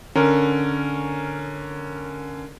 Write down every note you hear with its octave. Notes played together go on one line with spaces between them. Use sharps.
D3 C#4 A#4